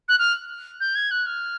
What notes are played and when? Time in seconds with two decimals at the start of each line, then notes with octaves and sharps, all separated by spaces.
0.08 F#6
0.19 F6
0.80 G6
0.96 G#6
1.11 F#6
1.26 F6